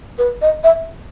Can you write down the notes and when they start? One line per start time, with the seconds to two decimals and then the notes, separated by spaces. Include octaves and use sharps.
0.18 B4
0.42 D#5
0.64 E5